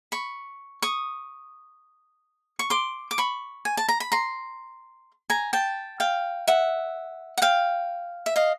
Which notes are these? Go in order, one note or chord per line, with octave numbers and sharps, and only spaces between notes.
B5 C#6
C#6 D#6
C#6
C6 D6
D6
B5 C#6
G#5
A5
A#5
B5
A#5 C6
G#5 A#5
G5 A5
F5 G5
E5 F#5
F#5
F5 G5
E5
D#5 F5